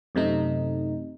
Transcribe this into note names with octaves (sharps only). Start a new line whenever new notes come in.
F#2 C3 A3 D#4